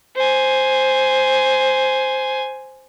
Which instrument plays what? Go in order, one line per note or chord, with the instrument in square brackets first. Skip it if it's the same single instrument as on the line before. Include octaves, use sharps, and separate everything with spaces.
[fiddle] C5 G#5